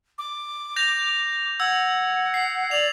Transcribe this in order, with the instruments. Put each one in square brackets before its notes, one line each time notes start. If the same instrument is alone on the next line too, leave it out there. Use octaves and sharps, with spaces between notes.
[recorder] D6
[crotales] G6 A#6 F7
[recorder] F#5 [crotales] E6 G#6
[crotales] C7
[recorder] D5 [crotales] F7 F#7